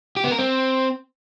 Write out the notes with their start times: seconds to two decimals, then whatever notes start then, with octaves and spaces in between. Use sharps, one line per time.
0.17 G4
0.24 B3
0.31 A#4
0.38 C4